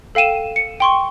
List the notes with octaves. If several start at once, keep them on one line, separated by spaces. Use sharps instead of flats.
A4 F5 G5 D#7 E7
C#7
G5 C6 C#6